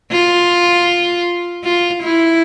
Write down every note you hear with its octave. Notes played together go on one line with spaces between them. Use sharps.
F4
F4
E4